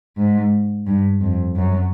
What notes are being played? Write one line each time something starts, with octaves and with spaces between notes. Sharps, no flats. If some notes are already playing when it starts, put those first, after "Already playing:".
G#2
G2
F2
F#2